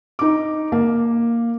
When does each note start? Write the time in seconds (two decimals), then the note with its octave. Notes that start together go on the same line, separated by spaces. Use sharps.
0.19 D#4 D6
0.72 A#3